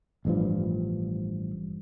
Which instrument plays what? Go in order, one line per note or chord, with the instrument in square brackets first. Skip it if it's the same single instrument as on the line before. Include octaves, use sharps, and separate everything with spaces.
[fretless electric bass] A1 G2 F3